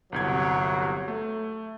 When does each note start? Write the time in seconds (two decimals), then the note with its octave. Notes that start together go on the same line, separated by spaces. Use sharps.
0.12 G1 C2 F#3 G#6
1.08 A3